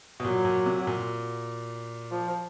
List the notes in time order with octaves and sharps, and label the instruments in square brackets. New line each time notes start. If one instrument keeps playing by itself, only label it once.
[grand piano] B2
[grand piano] A#2 [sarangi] F#3
[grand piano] A#2
C3
A#2
[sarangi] F3